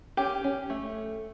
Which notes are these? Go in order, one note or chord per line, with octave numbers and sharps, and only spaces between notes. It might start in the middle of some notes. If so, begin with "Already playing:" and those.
C#4 G4
C#4
A3